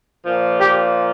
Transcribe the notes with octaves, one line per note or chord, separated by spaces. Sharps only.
A#2 F3
G4